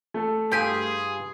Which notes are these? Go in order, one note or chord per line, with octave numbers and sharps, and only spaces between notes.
A3 A4
G2 F4 G4 G#4 G#5